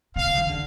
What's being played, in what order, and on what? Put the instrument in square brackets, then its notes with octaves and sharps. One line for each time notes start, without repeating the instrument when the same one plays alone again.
[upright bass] C3 [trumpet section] F5
[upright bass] C3
D#3
D3